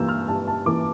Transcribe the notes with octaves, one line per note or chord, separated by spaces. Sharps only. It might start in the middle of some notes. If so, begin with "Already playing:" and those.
Already playing: G2 E3 A#3 E6 G6
F6
G2 A5
A5
E3 A#3 D6